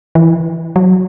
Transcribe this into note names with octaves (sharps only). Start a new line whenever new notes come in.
E3
F#3